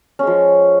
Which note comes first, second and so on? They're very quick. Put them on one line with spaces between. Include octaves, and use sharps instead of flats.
C#4 G#3 F3